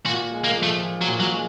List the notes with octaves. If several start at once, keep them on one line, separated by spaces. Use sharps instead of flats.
A#2 F#4
G#3
A#3
F3
A3
A#2
F#3
A#2
F#3
G#3